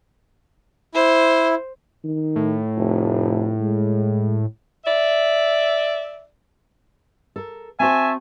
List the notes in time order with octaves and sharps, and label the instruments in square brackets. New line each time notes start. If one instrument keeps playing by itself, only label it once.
[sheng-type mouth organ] E4 [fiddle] C5
[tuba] D#3
[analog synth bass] A2
[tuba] F1
G#3
[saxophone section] D5 E5
[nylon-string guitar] A4 A#4
[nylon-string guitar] C4 F#4 C5 [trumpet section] E5 A5 C#6 [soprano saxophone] G#5